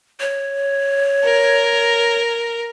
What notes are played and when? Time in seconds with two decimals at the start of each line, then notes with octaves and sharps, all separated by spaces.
0.20 C#5
1.24 A#4